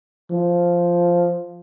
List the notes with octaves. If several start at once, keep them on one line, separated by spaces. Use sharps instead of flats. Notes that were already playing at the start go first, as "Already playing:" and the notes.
F3